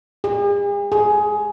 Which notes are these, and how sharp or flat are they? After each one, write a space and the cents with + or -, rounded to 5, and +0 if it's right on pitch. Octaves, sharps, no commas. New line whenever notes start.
G#4 -45
G#4 +15